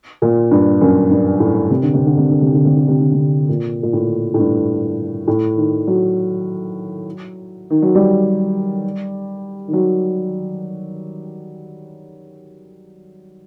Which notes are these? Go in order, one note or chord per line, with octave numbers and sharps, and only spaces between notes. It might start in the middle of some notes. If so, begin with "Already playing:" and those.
A#2
G2
F#2
G2
A2
C3
D3
C3
D3
C3
D3
C3
D3
C3
D3
C3
D3
C3
A#2
A#2
A2
A2
G2
A2
D#3
F#3
D#3
F#3
G3
D#3
F#3